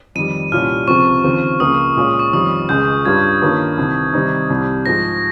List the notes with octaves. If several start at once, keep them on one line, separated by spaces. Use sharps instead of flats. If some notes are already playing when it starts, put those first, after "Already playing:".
F2 D#3 G3 D#7
C2 A#2 G3 C#4 F4 F6
C#2 C3 F3 C4 C#6
D#2 C#3 F3 C4
C#2 C#3 F3 A#3 D#6
A#2 G#3 C#4 F4
C#6
F2 D#3 G3 C#4 F4 D#6
C#2 C#3 G#3 G6
G2 G3 C#4 F4 G#6
G2 D#3 A#3 C#4 F4
C2 C3 D#3
C3 D#3 G3 C4 D#4
C2 C3 G3
G#2 F3 G#3 A#6